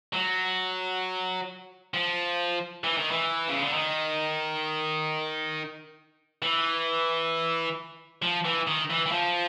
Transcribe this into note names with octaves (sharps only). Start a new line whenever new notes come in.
F#3
F3
E3
D#3
E3
C#3
D3
D#3
E3
F3
E3
D#3
E3
E3
F3